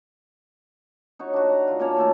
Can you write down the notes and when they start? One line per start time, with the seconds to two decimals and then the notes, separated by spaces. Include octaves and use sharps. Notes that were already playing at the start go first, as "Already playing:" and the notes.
1.19 D#4 F#4 C#5
1.34 D4 F#4
1.49 A#5
1.68 F#3 F4
1.79 A#3 C#4 C#5 A5
1.97 D#3 A3 A5